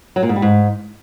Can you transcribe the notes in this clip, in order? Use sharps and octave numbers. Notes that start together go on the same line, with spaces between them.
F#3
A#2
G#2
G3
G#2